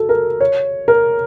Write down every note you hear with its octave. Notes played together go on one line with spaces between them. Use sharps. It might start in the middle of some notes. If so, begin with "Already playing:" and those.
Already playing: F#4 A4
A#4
C#5
A#4